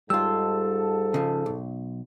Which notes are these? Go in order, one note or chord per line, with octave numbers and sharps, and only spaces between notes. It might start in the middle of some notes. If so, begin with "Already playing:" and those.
G#2 G3 F4 A4 E6
C#3 F3
B1